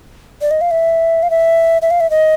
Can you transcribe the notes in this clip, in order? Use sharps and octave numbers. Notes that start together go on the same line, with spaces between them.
D5
D#5
F5
E5
F5
E5
E5
F5
E5
D#5